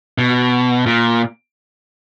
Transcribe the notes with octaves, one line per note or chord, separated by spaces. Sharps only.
B2
A#2